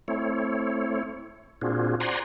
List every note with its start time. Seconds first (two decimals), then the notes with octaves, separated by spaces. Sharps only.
0.08 A3 C4 E4 C#5
1.62 A#2 C4 D4 F4 F#4 G#4
2.00 C5 D5 F#5 G#5 A#5 C6